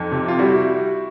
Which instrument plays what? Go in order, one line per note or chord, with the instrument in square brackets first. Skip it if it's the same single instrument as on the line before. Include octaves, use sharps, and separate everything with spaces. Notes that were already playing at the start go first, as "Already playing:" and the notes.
Already playing: [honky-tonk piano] F2 [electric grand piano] D#4
[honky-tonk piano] C3
[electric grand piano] F4
[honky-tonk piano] G3 [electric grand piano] E4 F#4